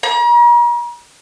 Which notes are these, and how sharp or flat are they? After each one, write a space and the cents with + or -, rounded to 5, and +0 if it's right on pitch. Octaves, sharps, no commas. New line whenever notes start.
A#5 +40